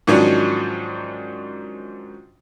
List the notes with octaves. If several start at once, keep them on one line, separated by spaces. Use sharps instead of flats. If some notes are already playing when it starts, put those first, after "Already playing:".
G#2 D#3 F3 F#3 C#4 D4